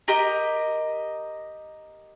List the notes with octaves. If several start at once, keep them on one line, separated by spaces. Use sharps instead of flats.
G4 A#4 D#5